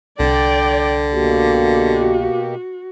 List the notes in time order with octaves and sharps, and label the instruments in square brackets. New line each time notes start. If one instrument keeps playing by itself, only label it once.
[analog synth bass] C2 [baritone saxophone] D3 [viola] D5 G5
[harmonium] B2 A#3 G4 [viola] F#4